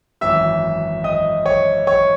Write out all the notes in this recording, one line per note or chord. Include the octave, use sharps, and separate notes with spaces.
G#1 F#2 E3 E5 E6
D#5 D#6
C#5 C#6
C#5 C#6